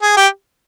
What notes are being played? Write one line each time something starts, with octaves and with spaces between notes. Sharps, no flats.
G#4
G4